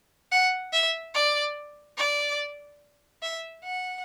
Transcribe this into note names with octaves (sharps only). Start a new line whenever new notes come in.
F#5
E5
D5
D5
E5
F#5